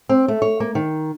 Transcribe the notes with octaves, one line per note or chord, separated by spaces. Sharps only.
C4
A3
C#5
A#3
D#3